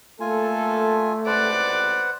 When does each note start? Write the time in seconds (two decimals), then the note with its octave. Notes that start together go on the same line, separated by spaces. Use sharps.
0.20 A3 A#3 F4 A4 G#5
1.27 C#2 A2 C3 B4 C5 D5 F#5